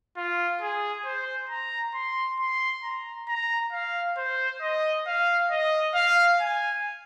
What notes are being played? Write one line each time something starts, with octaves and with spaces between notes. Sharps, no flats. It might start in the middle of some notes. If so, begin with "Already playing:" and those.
F4
G#4
C5
A#5
C6
C6
A#5
A#5
F5
C5
D#5
F5
D#5
F5
G#5